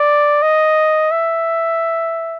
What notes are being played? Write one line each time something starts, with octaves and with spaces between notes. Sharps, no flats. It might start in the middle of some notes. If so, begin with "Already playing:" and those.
Already playing: D5
D#5
E5